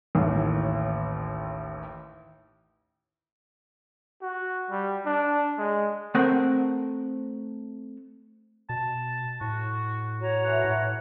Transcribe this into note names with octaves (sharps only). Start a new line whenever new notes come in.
A1 D#2 A2
F#4
G3
D4
G#3
A3 C4 A#4 F#5
B2 A5
A2 F#4
F#4 C#5 A#5
E3 A3 F#5 C6
A2